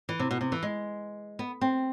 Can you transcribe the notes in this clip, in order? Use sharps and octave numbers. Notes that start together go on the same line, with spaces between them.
E3
C3
B2
C3
E3
G#3
B3
C4